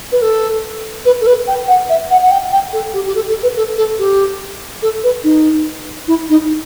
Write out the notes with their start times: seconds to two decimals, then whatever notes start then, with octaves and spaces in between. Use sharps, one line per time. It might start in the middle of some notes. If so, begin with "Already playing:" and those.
0.12 B4
0.22 A4
1.05 B4
1.21 A4
1.26 B4
1.47 G5
1.68 F#5
1.89 E5
2.11 F#5
2.22 F#5
2.31 G5
2.52 G5
2.73 A4
2.94 G4
3.06 G4
3.15 A4
3.29 A4
3.43 B4
3.56 A4
3.77 A4
3.99 G4
4.82 A4
5.04 B4
5.24 D#4
6.08 E4
6.29 D#4